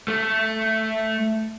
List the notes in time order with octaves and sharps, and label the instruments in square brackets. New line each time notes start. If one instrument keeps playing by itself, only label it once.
[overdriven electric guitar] A3